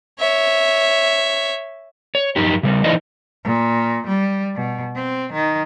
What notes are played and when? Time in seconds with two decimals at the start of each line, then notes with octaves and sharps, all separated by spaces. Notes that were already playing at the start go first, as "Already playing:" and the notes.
0.20 C#5 E5
2.15 C#5
2.36 F#2 D#4 G4
2.63 C#3 G3
2.84 E3 D#4 E4 C5 D5 D#5
3.44 A#2
4.07 G3
4.55 B2
4.95 C4
5.33 D#3